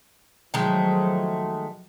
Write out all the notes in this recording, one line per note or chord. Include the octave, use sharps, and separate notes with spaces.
D#3 F3 F#3 G#3 A3